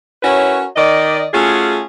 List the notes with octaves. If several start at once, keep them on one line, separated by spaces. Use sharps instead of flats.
C#4 E4 F#4 A#4 B4 C#5
D#3 D5 D#5
A3 C#4 F4 F#4 G#4